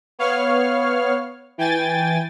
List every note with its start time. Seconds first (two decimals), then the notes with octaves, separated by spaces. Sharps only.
0.19 B3 C#5 F5 F6
1.58 E3 G5 G#5 A6